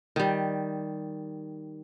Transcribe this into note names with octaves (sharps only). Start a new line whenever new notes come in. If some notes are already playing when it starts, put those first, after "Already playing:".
D#3 G3